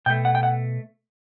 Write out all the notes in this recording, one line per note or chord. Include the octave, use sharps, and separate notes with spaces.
B2 A3 G5
F#5
G5
F#5